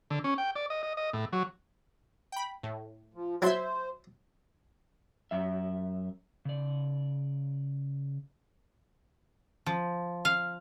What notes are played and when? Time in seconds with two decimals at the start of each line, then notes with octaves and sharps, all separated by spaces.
0.10 D3
0.24 C#4
0.38 G5
0.56 D5
0.70 D#5
0.83 D#5
0.97 D#5
1.13 A2
1.33 F#3
2.32 G5 B5
2.63 A2
3.14 F3
3.42 F#3 E4 C5 E5 A5 C6 G#6
5.31 F#2 E5
6.45 C#3 D5
9.66 F3
10.25 F5